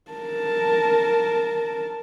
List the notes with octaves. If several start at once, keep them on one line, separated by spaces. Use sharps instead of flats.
A#4 A5